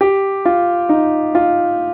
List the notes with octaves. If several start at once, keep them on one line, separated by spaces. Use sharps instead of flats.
G4
F4
D#4
F4